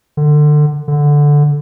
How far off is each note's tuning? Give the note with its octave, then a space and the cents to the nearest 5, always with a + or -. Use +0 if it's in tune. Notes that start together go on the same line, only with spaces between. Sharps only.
D3 +25
D3 -5